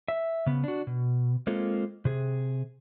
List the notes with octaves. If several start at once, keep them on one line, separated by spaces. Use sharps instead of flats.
E5
C#3 B3
D4 F#4
B2
G#3 A#3 C4 F4 A4
C3 G#4